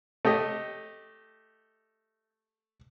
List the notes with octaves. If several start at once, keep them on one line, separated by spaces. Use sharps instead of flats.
A3 G4 D#5